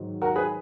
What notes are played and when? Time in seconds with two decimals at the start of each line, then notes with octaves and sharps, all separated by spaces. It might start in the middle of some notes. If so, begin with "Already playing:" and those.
Already playing: G#2 D#3 F#3
0.22 F#4 A#4
0.35 G#4 B4